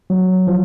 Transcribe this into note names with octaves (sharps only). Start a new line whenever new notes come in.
F#3
F3